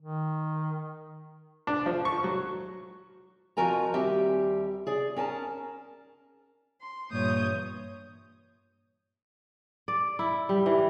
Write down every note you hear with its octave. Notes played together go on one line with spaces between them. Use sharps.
D#3
D4
F3
C#6
F#3
F2 F3 F#4 A#4 G#5 A#5
D#2 G3 C4 G4 E5
G#4 D5
C#4 A#4 G#5 A5
C6
G2 A#2 E3 C#5 D#6 G6
D5
E4
G3
E3